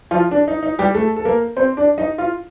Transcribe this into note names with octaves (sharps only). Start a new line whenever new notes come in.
F3 F4
D4
D#4
D#4
G3 G4
A3 A4
A4
A#3 A#4
C4 C5
D4 D5
D#4 D#5
F4 F5